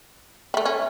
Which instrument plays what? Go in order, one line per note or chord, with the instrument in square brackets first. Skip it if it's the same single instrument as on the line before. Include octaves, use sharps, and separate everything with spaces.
[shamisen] G3 A3 [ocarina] E5
[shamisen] C#4